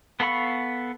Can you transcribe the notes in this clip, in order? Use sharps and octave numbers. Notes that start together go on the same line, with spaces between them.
B3 A4 F5 B5 C#6